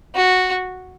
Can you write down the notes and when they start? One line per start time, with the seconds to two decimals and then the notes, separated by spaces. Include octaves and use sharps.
0.15 F#4